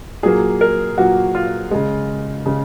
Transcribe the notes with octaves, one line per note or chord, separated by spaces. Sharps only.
A#2 F#3 A#3 G#4
A#4
A#2 F#3 A#3 F#4
F4
C#3 G#3
C#3 G#3